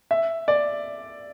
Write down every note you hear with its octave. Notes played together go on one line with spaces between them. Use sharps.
E5
D5